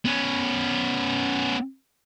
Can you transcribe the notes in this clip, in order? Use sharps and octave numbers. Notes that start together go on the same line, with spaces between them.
B3 C#4